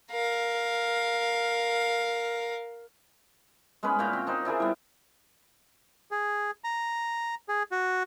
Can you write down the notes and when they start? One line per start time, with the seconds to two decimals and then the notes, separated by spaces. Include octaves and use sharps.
0.11 A#4 F5
3.83 G#3 B3 C#4 B4
3.99 A#2 C#5 F5 G5
4.13 C4
4.27 D4 D#4 C5
4.45 D4 E4 G#4 A#4
4.60 G3 B3
6.11 G#4
6.64 A#5
7.49 G#4
7.72 F#4